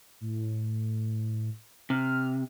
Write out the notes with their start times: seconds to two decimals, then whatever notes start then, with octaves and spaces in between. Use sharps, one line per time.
0.21 A2
1.90 C3 F6